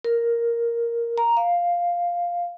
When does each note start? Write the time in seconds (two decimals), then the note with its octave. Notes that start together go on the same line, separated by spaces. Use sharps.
0.04 A#4
1.18 A#5
1.37 F5